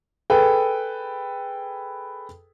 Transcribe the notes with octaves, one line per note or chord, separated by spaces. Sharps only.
G#4 A4 B4 G5